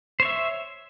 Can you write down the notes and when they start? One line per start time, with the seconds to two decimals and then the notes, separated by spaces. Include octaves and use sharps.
0.20 C5
0.22 C#5
0.25 E5